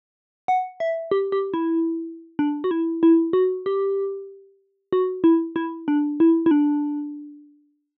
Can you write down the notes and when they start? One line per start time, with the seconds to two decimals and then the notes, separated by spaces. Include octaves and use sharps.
0.48 F#5
0.80 E5
1.11 G4
1.32 G4
1.54 E4
2.39 D4
2.64 F#4
2.71 E4
3.03 E4
3.33 F#4
3.66 G4
4.93 F#4
5.24 E4
5.56 E4
5.88 D4
6.20 E4
6.46 E4
6.51 D4